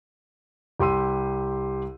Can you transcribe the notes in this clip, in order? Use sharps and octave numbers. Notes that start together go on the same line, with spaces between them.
C2 G4 C6 E6 D#7